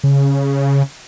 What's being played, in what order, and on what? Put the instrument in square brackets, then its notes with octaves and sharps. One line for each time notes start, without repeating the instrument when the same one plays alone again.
[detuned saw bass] C#3